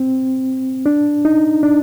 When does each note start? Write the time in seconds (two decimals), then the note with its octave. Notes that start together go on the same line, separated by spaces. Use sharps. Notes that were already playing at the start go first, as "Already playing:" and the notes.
Already playing: C4
0.86 D4
1.25 D#4
1.63 D4